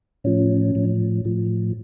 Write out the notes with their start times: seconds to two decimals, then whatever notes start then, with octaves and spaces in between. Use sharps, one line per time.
0.24 A2 F3 C#4
0.75 A2 F3
1.25 A2 F3